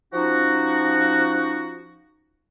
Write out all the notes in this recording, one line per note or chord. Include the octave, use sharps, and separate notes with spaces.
F3 C#4 D#4 F#4